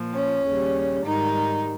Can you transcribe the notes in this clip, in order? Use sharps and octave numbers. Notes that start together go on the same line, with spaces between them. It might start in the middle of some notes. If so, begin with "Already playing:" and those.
Already playing: A#2 F3
C#4
D#2 C#3 G3
G#2 D#3 G3 D#4